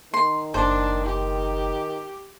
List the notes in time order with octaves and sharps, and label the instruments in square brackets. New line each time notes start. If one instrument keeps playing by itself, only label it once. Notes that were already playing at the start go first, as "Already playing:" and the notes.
[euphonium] D#3 [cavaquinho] C6
[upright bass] F#1 [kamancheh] D4 [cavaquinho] C5
[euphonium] D#3 [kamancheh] G4